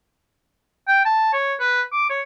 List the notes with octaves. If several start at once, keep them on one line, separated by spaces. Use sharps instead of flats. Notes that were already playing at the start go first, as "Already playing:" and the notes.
G5
A5
C#5
B4
D6
C#5